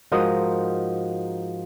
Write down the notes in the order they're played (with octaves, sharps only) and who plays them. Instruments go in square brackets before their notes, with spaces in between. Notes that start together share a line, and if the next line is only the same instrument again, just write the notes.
[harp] G#2 F3 F#4 A#4 D#5 D#6